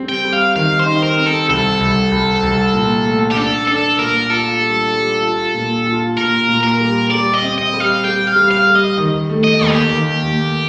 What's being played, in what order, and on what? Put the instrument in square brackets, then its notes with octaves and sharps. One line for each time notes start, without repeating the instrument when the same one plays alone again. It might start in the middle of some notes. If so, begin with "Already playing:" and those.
Already playing: [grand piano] G3 C4
[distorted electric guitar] G5
[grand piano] G3
[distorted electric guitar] F5
[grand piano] D#3 [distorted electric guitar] F5
[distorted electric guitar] C5
[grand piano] D#4
[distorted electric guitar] A#4
[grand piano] C4
[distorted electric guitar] A4
[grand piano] C2 [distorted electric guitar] A4
[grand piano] C2
C2
C2
A#2
A3
[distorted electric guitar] G4
[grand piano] D4 [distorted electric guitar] A4
[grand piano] D4 [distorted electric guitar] A4
[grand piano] A#2 [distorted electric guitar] A#4
[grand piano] F4 [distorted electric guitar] A4
[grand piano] G3
G3
F4
A#2
F4
[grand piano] A#2 [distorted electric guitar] A#4
[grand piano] A#2
[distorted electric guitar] A#4
[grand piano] G3
[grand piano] G3 [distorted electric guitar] D5
[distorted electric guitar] D#5
[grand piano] C4
[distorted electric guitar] D#5
[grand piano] G3
[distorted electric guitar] F5
[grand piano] G3 [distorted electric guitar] G5
[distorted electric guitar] F5
[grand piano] G3
[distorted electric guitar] F5
[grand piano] G3
[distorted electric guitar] D#5
[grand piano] D#3
A3
[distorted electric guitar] D#5
[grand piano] D#2
[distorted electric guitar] G4
[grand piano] D#3
D#2